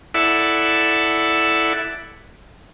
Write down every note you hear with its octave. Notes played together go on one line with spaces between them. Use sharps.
E4 A4 D5 E5 F#5